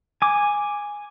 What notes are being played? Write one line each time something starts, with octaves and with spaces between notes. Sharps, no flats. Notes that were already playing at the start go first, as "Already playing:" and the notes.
G#5 D6